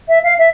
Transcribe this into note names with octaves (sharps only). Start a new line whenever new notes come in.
E5
F5
E5